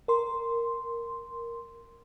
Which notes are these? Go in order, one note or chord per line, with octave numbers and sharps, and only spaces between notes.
A#4 C6